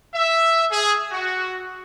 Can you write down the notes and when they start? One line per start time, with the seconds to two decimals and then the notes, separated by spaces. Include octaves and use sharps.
0.14 E5
0.71 G#4
1.12 F#4